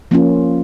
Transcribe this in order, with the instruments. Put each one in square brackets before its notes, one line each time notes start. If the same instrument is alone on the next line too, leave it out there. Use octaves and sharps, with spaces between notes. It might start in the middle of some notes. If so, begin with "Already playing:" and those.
[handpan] F3 A#3 C#4 F4